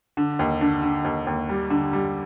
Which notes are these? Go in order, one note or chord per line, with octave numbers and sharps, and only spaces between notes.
D3
D#2
D3
D3
D#2
D#2
G3
D3
G3